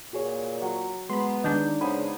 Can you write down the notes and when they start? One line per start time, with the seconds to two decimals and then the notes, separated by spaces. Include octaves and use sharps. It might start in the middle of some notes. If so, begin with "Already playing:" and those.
0.13 A#2 F#4 G#4 C#5
0.62 F#3 C#6
1.10 G#3 B3 B5 C6
1.44 D#3 G#3 D4 D#4 G6
1.81 C#3 B3 C5 G#5 B5